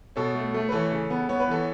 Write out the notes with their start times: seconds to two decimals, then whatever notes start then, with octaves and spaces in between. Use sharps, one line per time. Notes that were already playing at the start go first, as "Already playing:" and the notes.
0.16 B2 A4 C#5
0.35 A3
0.54 A3
0.69 B4
0.72 E3 A4 C#5
0.91 C#3
1.10 B3
1.29 B3 C#5
1.40 B4
1.48 E3 A4 C#5